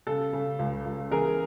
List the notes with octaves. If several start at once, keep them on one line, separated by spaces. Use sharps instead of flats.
C#3 A4
C#3
C#2
C#2
E3 G#4 A#4